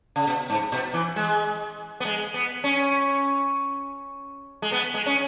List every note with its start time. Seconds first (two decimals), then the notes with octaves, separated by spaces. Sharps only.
0.16 C#3
0.27 B2
0.50 G#2
0.72 B2
0.94 E3
1.16 G#3
2.00 B3
2.05 G#3
2.34 B3
2.64 C#4
4.62 G#3
4.72 B3
4.94 G#3
5.06 C#4